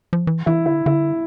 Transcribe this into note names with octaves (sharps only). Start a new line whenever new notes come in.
F3
E3
E3 E4
D3 E4
D3 E4